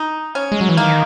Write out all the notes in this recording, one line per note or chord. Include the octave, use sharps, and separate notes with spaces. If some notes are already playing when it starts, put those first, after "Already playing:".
Already playing: D#4
C#4
G#3
F#3
E3
D#3 A#3